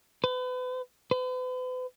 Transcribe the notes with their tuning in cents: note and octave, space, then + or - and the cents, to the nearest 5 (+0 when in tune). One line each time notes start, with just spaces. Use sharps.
B4 +35
B4 +45